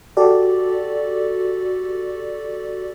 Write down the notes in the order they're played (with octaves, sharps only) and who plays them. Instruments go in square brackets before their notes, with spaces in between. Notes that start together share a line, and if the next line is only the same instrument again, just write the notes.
[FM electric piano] F#4 G4 A4 D5